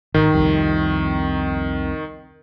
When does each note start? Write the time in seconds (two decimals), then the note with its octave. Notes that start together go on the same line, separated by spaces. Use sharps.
0.14 G#1 D#3
0.34 C2 F2 C3